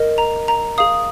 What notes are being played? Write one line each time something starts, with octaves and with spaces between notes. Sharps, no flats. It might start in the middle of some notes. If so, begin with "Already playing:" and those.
Already playing: A#4 D#5
A#5
A#5
G#4 F5 D#6